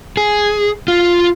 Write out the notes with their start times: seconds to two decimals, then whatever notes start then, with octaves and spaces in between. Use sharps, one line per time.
0.17 G#4
0.88 F4